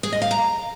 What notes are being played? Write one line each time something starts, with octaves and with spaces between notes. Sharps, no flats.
G#4
D#5
F5
A#5